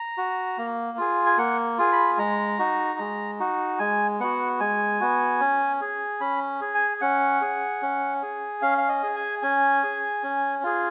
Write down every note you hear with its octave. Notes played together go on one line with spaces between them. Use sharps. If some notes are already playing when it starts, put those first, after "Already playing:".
Already playing: A#5
F#4
A#3
F4 G#4
G#5
A#3 F#5
F4 G#4
B5
G#3 A#5
D#4 F#4
G#3
D#4 F#4
G#3 G#5
B3 F#4 F#5
G#3 G#5
B3 F#4
C#4
G#4
C#4 B5
G#4
G#5
C#4 F#5
G#4
C#4
G#4
C#4 F5
F5
D#5
G#4
G#5
C#4 G#5
G#4
C#4
F4 G#4